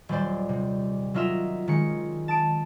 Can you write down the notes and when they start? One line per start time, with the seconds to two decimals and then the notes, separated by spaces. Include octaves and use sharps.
0.09 D#1 F#3 G3 C5 D5
0.49 C3
1.14 F#3 D#4 F4 A#4 E5
1.68 D#3 G#3 C#4 C#7
2.28 A5 D#6 D7